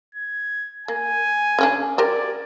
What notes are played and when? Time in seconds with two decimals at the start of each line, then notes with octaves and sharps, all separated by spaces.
0.15 G#6
0.88 A#3 G#5
1.59 C#3 C#4 D4
1.98 G4 A#4 C5 D5